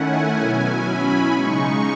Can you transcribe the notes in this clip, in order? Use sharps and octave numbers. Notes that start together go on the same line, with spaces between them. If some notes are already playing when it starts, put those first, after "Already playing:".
Already playing: D#3 A3 C#4 E4 F#5 G#5
B2 F#3 C#4 E4
B5
C#3 G#3 D#4 C#6